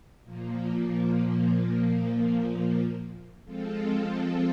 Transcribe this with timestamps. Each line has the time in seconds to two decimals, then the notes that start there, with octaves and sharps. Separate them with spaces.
0.24 A#2 F3 A#3
3.45 F3 G#3 C4 F4 A4